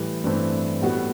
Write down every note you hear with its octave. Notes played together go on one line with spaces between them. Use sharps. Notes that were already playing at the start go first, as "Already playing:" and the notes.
Already playing: A2 E3 G3
G2 E3 A3 C4
A2 G3 B3 F#4